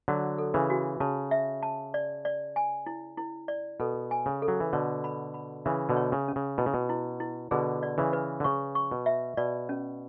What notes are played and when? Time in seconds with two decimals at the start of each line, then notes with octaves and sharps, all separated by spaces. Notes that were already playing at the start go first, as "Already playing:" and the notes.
0.08 D3 F#3 F#4
0.38 A4
0.54 C#3 E3
0.70 F#4
1.00 C#3 A5
1.31 E5
1.63 A5
1.94 D5
2.25 D5
2.56 G#5
2.86 E4
3.17 E4
3.48 D5
3.80 B2 A4
4.11 G#5
4.26 C#3
4.42 A4
4.48 F#3
4.60 E3
4.73 B2 D3 C#5
5.04 B5
5.34 B5
5.65 C#3 E3 E5
5.89 B2 D3
5.97 C#5
6.12 C#3
6.28 C#4
6.36 C#3
6.58 B2 E4
6.66 C#3
6.74 B2
6.89 E4
7.20 E4
7.51 B2 D3 G#4
7.83 D5
7.98 C#3 E3
8.13 B4
8.40 D3
8.44 C#3 C#6
8.75 C#6
8.91 B2
9.06 E5
9.37 B2 D5
9.69 C#4